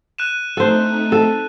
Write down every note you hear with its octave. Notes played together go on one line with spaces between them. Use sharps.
F#6 D#7 E7
A3 C4 D#4 A4 C5
A4